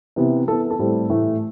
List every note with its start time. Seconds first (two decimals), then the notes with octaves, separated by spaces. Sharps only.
0.16 C3 E3 B3
0.48 E3 B3 A4
0.71 A4
0.79 A2 G3 C4
1.10 A2 E3 A3